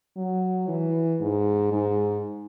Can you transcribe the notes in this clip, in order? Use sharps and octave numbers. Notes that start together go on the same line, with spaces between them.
F#3
E3
G#2
G#2